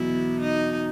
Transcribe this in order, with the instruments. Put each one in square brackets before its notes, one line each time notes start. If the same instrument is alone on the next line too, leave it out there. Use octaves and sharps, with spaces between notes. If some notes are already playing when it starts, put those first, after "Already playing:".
Already playing: [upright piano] E2 B2 F#3 [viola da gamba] E4
[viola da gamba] D#4